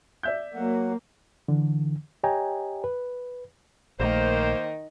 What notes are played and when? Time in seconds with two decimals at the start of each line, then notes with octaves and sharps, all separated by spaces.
0.23 D5 E5 G6
0.55 F#3 A#3 F#5
1.48 D3 E3
2.23 G4 C#5 D#5 G5 G#5 A#5
2.84 B4
4.00 A#1 D#3 A3 A#3 C5